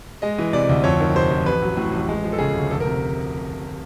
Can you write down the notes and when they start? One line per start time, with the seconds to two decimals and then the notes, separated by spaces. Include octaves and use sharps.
0.22 G#3 D#5
0.38 E3
0.53 C3 D5
0.69 D2
0.84 F2 C#5
1.00 D#3
1.15 C3 C5
1.31 F2
1.46 A1 B4
1.62 F#3
1.77 A2
1.93 A1
2.08 G#3
2.24 F3
2.33 A4
2.39 C#3 G#4
2.55 D2
2.70 F1 A4
2.80 A#4
2.86 C3